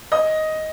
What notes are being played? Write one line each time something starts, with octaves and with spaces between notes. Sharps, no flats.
D#5 D#6